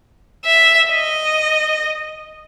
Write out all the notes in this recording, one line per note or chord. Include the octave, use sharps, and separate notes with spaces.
E5
D#5